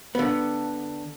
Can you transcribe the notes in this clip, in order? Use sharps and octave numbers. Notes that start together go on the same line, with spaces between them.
D3 B3